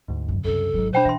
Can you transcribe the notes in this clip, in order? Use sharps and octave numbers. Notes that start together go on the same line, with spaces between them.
D2 G#2
F#2 C#3
C2 F#2 C#3 A4
G#1 G#2 F#3
B2 D4 C5 C#5 G5 B5
E3 E5 C6